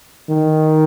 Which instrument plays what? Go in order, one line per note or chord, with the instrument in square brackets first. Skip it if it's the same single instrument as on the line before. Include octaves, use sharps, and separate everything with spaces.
[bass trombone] D#3